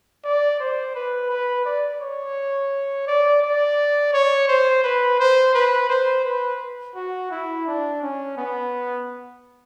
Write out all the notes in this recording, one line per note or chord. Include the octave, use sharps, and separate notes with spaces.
D5
C5
B4
B4
D5
C#5
D5
D5
C#5
C5
B4
C5
B4
C5
B4
F#4
E4
D4
C#4
B3